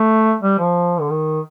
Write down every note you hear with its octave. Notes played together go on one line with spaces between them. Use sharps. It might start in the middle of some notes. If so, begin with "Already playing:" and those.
Already playing: A3
G3
F3
D3
D#3